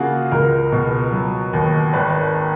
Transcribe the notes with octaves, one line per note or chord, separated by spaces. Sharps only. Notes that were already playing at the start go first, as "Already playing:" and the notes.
Already playing: C#3 A#3 F4 F#4 G#4
C#2 A#4
B2
F#3
D#2
G#1 B4